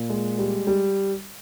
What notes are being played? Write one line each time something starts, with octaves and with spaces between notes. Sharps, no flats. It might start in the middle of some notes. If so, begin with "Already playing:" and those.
Already playing: A#2
G#3
G3
G3